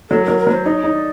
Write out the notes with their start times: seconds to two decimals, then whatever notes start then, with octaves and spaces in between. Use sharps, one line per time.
0.10 F#3 A4
0.24 F#3 A#4
0.38 A#4
0.47 F#3
0.52 C5
0.66 D#4 D5
0.71 C#5
0.84 D#4
0.93 D5